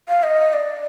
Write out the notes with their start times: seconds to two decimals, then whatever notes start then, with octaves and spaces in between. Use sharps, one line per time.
0.08 F5
0.23 D#5
0.53 D5